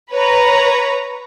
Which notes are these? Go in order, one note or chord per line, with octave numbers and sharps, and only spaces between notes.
B4 C#5 A#5